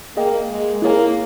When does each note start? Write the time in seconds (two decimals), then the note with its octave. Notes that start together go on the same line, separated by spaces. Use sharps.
0.16 A#3 G#4 D#5 G5
0.49 G#3
0.82 A#3 E4 G#4 C#5 G#5